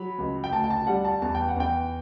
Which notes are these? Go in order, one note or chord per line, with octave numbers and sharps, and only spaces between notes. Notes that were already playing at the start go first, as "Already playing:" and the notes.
Already playing: F#3 B5
C#2
G5
D2 A5
G5
A5
G3 F#5
A5
E2 A5
G5
F#5
E2 G5